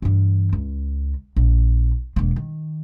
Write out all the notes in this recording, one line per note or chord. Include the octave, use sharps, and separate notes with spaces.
G2 E3
C#2
A#1
E1 A#3
D#3